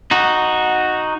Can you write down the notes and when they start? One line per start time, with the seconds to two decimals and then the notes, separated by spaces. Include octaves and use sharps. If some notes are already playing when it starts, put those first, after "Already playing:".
0.11 D#4 F#4